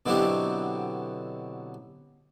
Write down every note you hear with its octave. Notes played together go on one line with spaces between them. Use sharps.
B2 D3 F#3 C4 E4 G4